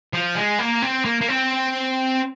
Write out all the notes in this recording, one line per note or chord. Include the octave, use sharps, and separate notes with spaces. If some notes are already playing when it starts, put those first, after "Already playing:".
F3
G#3
A#3
C4
A#3
A#3
C4